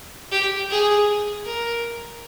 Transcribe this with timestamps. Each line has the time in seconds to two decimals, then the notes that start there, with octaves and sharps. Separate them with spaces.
0.32 G4
0.70 G#4
1.45 A#4